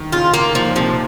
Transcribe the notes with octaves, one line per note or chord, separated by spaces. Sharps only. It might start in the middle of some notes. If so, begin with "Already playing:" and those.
Already playing: D#3
C#3 F4
A#3
A#2 F3
C3 F3